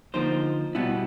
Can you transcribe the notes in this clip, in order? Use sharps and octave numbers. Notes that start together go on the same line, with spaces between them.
D3 F3 A#3 D#4 C5
B2 G3 B3 E4